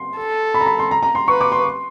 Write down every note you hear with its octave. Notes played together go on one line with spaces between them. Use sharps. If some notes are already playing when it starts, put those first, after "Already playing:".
Already playing: C6
A4
B5
A#5
B5
C6
A#5
A#5
C6
B4 C#6
D6
C6